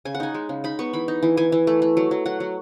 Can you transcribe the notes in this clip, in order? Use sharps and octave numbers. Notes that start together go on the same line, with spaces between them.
C#3 G#5
F#5
D#4 G#5
G#3
C#3
D#4 B5
B3 C#6
E3 B5
D#4
E3
E3 G#5
E3
A3
A3
F#3
F#3
F#3 F#5
F#3